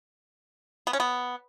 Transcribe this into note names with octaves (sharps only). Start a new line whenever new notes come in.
B3
C#4
B3